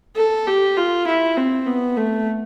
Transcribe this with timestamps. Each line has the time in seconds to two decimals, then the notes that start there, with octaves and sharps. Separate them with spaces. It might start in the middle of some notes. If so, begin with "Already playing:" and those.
0.16 A4
0.47 G4
0.77 F4
1.07 E4
1.37 C4
1.67 B3
1.97 A3